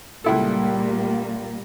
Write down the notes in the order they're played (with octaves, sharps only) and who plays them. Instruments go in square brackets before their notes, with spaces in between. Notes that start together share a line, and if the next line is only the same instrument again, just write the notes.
[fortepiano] C#2 E4 A4 [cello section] A#2 G3 A#3